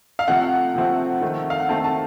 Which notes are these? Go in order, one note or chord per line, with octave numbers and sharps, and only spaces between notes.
F5
C3 F3 A3 C4 F#5
C3 F3 A3 C4
D#3 A3 C4
F5
F#5
D#3 A3 C4 A5
A5